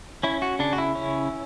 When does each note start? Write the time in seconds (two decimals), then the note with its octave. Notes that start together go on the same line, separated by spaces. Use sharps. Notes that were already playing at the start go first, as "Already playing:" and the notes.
0.23 C#4 E4
0.42 F#4
0.59 C#3 D4
0.73 F#4
0.78 E4
0.95 C#4